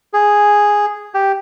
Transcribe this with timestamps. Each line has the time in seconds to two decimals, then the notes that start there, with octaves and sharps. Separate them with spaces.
0.14 G#4
1.14 G4